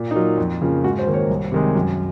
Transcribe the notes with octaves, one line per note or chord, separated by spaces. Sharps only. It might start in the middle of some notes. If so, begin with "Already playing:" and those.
Already playing: A#2
D#4
F#3 A#3 F4
F2
C#3 F3 A#3
G#2 F#4
C5
D#3 A#3
C#5
C2
C3 D#3 G#3
F#2